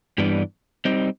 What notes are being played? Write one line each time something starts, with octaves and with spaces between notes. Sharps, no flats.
G2 E3 G3 B3 D4
G3 C4 D#4